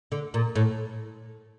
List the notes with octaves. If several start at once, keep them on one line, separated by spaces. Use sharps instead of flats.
D3
A#2
A2